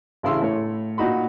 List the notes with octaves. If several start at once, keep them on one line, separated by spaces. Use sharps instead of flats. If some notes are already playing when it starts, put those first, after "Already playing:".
A1 C#3 E4 G#4 C6 E6
A2 C#5
A#2 D#4 F#4 B5